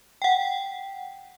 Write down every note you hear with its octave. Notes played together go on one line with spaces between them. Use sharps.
F#5 G5